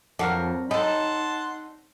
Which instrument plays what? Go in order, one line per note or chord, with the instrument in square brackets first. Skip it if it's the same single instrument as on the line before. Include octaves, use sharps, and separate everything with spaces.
[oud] F2 [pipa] D4 F#4 A#4
[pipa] G3 A4 [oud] D#4 [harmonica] F#5 A5 C6